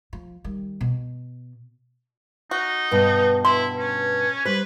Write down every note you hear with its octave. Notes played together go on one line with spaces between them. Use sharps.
F3
D#3 G3
B2
D#4 F#4
G2 B2
E4 C6
C#4
G3 B4 C5